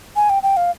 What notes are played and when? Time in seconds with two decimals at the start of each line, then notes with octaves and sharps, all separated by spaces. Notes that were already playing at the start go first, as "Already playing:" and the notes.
0.16 G#5
0.30 G5
0.43 G5
0.57 F5